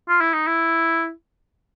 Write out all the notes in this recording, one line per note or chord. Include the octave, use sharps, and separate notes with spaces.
F4
E4
D#4
E4